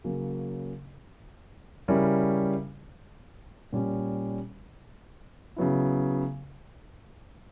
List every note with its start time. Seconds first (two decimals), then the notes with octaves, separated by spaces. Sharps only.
0.04 C#3 F#3 A#3 C#4
1.88 C#3 G3 C#4 E4 A#4
3.73 A#2 G3 C#4
5.56 C#3 F#3 B3 E4